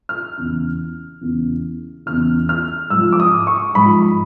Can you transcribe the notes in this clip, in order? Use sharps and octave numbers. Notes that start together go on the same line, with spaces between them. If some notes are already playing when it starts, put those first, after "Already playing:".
F6
E2 C#3 E3
E2 C#3 E3
E2 C#3 E3 F6
F6
G#2 F3 E6
D6
D#6
C#6
G#2 F3 B5